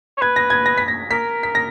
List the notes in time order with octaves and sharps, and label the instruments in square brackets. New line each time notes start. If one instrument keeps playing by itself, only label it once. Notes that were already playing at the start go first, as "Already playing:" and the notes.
[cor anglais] C#5
[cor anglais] B4 [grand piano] G#6
[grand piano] A#6
G#6
A#6
B6
A#6
[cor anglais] A#4 [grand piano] B6
[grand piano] B6
A#6